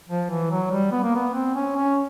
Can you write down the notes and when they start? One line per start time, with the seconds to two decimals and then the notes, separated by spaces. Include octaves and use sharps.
0.09 F3
0.30 E3
0.51 F#3
0.71 G3
0.92 B3
1.03 A#3
1.15 B3
1.34 C4
1.55 C#4
1.76 C#4